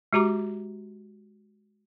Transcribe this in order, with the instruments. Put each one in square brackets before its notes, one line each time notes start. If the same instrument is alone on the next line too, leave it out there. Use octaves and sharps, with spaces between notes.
[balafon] G#3 F#4 G4 A#5 D6